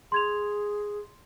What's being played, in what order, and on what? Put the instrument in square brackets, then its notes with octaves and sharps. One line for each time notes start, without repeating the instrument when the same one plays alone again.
[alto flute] G#4 [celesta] C6 G#6 F7